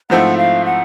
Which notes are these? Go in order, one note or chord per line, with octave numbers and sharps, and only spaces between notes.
G#2 F3 A3 C4 E4 F#5
F5
F#5